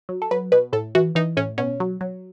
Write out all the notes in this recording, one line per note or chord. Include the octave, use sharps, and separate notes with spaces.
F#3
A4
F#3 B4
B2 B4
A2 A4
E3 F#4
E3 D#4
A2 C#4
B2 C#4
F#3
F#3